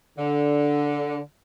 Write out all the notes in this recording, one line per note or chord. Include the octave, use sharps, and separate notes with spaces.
D3